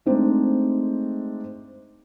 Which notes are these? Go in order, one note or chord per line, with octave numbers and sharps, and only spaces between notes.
G#3 A3 C4 D4 D#4